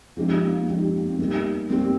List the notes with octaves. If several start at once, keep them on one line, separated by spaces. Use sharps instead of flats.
F3 G#3 C4 D#4 G4
A#3
F3 G#3 C4 D#4 G4
C4
A#3
C4
G3 A#3 D#4 G4
G3 A#3 C4 D#4 G4